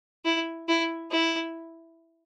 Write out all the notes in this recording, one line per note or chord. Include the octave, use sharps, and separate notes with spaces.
E4
E4
E4